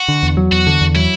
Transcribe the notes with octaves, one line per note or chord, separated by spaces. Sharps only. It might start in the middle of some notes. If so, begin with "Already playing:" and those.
Already playing: F#4
D3
E2
F#3
E2 F#4
D3
E2
F#3 E4